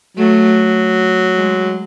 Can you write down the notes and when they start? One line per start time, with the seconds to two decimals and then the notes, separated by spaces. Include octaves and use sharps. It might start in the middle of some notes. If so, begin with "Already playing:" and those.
0.16 F#3 A3
1.36 G#3